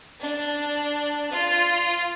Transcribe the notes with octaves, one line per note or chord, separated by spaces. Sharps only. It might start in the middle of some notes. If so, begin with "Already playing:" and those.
D4
F4